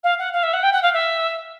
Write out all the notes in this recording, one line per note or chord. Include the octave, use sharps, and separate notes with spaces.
F5
F#5
F5
E5
F#5
G5
F#5
F5
E5